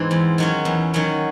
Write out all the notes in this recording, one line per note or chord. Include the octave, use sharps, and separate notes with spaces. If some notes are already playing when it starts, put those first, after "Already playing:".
Already playing: G#2 E3 C4
E2
D#3 F#3 C#4
E2
D#3 F#3 C#4